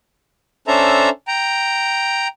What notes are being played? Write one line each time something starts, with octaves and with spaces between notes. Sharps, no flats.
C#4 D4 A4 C5 E5 A#5
G5 A#5